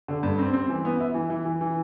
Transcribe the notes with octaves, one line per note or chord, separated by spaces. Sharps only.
D3
G2
C4
C4
E3
B3
E4
E3
E3
E3
E3